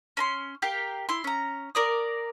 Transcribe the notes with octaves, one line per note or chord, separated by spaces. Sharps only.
C#4 A#5 C6
G4 A#4 F5 G5
E4 C6
C#4 A#5
A#4 D5 D#6